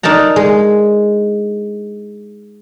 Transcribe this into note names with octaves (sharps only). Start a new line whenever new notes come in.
D4 D#4 A#4 A5 A#5
G#3